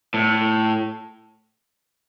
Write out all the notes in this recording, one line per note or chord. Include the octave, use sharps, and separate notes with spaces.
A2